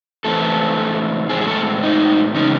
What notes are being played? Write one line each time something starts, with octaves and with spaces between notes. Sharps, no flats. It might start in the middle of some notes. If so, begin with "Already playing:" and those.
E3 A3 C4 A4
A2 G#3 C4 G#4
G#4
A4
D#4
C#3 E3 G#3 C#4 D#4